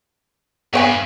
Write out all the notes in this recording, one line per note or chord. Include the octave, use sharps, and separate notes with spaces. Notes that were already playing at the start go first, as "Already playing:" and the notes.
G2 B3 C#5 G#5